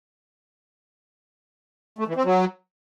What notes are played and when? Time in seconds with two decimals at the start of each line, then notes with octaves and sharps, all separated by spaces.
1.99 A3
2.07 E3
2.16 C4
2.25 F#3